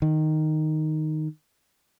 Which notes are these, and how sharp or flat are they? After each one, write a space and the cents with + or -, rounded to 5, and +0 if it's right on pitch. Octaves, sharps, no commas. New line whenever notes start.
D#3 -5